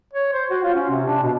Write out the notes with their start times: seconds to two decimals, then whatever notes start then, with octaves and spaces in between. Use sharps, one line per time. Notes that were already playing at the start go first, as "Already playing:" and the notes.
0.13 C#5
0.33 C5
0.50 F#4
0.63 F4
0.75 C#4
0.90 C3
1.07 D4
1.22 B2